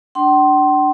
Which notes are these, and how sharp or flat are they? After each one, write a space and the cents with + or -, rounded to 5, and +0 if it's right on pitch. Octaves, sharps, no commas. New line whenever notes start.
D4 +0 G5 -45 C6 +15